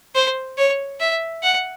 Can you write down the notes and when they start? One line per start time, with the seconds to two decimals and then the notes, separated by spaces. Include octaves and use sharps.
0.15 C5
0.58 C#5
1.00 E5
1.43 F#5